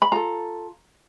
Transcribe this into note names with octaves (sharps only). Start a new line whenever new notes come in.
B5
F4 A4 A#5